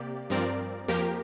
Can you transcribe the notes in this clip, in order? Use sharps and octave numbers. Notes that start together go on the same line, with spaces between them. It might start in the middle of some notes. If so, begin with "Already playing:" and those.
Already playing: C3 A#3 G4 D5
G2 F3 C4 A#4 D5
F2 F3 A#3 G4 A#4